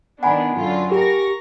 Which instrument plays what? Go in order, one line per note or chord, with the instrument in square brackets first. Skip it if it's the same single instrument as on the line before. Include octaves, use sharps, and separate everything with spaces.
[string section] D#3 B3 D4 [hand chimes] F#5 G#5 B5
[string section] F#2 D3 F4
[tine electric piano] G4 [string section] A#4 C#6 A#6